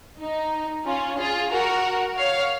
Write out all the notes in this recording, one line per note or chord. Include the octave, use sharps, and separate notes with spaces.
D#4
C#4 F4
F4 G#4
F#4 A#4
C#5 F5